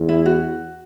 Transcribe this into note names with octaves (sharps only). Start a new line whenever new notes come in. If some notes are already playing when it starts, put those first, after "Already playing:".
Already playing: E2
E4
F#4